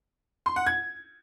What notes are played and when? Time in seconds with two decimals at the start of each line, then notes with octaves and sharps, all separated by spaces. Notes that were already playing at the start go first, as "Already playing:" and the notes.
0.46 C6
0.56 F#5
0.67 G#6